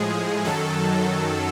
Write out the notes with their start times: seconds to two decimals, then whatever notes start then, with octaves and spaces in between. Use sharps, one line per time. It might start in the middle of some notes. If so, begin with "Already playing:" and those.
Already playing: A2 F3 G#3 G#4
0.44 F#2 D#3 F#3 A4